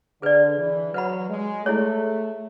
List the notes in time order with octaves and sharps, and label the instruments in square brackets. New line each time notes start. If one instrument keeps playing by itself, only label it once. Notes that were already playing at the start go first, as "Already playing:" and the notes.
[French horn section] D3 [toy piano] G#4 B4 D5
[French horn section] E3
[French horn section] F#3 [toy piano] B4 F#5 B5
[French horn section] G#3
[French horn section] A3 [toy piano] E4 G#4 C#5